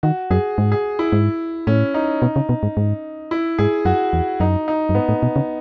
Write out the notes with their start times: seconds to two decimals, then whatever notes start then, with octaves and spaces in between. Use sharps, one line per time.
0.03 D#3 F#4
0.31 F#2 G#4
0.58 G#2
0.72 G#4
0.99 E4
1.12 G#2
1.67 A2 C#4
1.94 D#4
2.22 B2
2.36 C#3
2.49 B2
2.63 G#2
2.77 G#2
3.31 E4
3.58 G#2 G#4
3.85 F#2 F#4
4.13 E2
4.40 F#2 D#4
4.68 D#4
4.89 F#2
4.95 G#2 B3
5.09 A2
5.23 B2
5.36 C#3